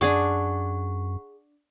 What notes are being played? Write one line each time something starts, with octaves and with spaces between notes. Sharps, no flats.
F#2 D4 G#4 F#5 C#6 D6